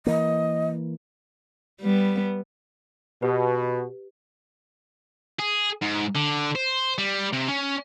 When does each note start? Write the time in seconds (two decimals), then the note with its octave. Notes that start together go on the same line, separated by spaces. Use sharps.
0.06 E3 A#3 D#5
1.81 G3 B3
3.22 B2 G4 B4
5.39 G#4
5.82 G#2
6.15 D3
6.55 C5
6.98 G3
7.33 C3
7.48 C#4